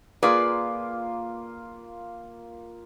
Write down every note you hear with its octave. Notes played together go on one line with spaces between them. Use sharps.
A#3 F4 G#4 B4 D5